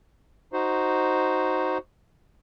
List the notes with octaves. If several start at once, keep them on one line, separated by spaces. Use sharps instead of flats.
D#4 F#4 C5